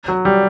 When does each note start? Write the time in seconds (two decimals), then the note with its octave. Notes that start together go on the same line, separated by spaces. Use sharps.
0.08 F#3
0.25 G3